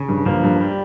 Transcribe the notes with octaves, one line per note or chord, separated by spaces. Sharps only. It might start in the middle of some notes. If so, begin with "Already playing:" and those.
Already playing: C#3
G2
G2 F3 A#3
G2
G3